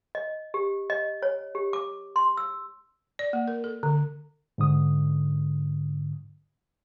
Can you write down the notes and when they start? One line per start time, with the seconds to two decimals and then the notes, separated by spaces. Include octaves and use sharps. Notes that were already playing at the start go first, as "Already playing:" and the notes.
0.15 D#5
0.54 G4
0.90 D#5
1.22 C#5
1.55 G4
1.73 D6
2.16 C6
2.37 E6
3.19 D5
3.33 A#3
3.48 A#4
3.64 A4
3.83 D3
4.58 G#2 D3 D#6